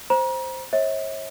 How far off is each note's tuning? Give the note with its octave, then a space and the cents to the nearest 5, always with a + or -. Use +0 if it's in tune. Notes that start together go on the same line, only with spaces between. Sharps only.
C5 +0 A#5 +40
C#5 -35 E5 -40